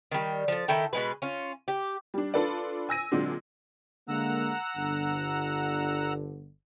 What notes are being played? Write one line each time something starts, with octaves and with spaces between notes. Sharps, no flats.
D#3 G3
F3 A4
D#3 E4 A4 G5
B2 G#3 B4
C#4 F4
G4
G3 D4
D4 F4 A4 B4 D5
G#5 E6 A#6 D#7
A#2 D3 F#3 G#3 C4 D4
D3 G#3 A#3 F#5 A#5 E6
G1 D3